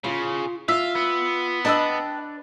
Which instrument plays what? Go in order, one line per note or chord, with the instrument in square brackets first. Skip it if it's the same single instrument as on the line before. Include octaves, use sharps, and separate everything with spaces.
[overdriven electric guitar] C#3 [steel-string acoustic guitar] F4
[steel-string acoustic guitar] F4 [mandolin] E5 [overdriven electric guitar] F5
[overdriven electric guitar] B3
[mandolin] D4 B4 E6 [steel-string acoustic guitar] D#5 G5 A5